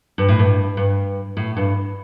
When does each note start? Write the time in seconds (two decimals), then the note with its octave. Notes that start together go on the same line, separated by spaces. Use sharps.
0.18 G2
0.29 A2
0.39 G2
0.77 G2
1.37 A2
1.57 G2